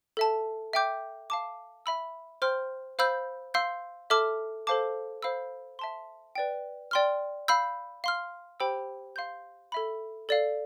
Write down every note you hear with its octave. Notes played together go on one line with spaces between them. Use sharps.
A4 E5 A5
E5 G5 D6 G6
F5 A5 D6
E5 B5 E6
C5 G5 C6 F6
C5 F5 B5 E6 G6
F5 C6 E6 G6
A4 E5 A5 D6 F6
A4 C5 F5 A5 D6
C5 F5 B5 E6
E5 A5 C6
B4 D5 G5
D5 G5 C6 F6
F5 B5 E6 G6
F5 C6 F6
G4 C5 G5 B5 E6
F5 C6 G6
A4 E5 B5
A4 D5 F5